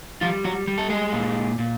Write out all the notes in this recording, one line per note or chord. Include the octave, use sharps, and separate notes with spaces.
F3 G3 F4
F#3 F#4
G3
A4
G#3 G#4
A#2
A#2